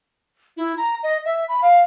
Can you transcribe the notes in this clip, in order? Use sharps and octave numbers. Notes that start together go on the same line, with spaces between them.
E4
A#5
D#5
E5
B5
F5